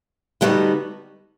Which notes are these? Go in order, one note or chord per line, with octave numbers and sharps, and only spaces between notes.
D3 G3 B3 D#4 F#4